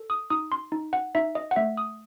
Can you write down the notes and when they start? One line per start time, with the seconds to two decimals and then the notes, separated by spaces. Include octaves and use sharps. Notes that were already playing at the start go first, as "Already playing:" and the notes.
Already playing: A4
0.10 D#6
0.30 D#4 D#6
0.52 C6
0.72 D#4
0.93 F#5
1.15 D#4 E5
1.35 D#5
1.51 F#5
1.56 A3 E5
1.77 D#6